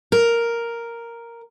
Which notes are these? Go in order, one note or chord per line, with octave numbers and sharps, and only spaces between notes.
A#4